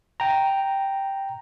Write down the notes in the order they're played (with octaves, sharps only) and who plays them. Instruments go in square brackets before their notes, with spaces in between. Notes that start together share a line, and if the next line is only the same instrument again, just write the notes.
[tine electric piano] G5 A#5